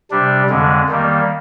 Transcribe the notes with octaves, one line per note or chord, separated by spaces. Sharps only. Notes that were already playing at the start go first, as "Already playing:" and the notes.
C3 G3 D4
F2 D3 G#3
D#3 G3 A#3